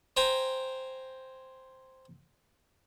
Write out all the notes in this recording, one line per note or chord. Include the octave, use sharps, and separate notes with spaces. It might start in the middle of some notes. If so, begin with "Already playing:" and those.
C5 G5 G#5 A#5